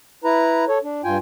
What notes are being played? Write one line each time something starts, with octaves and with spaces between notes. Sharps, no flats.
E4 B4 A#5
A4 C#5
D4
G2 F4 G5 G#5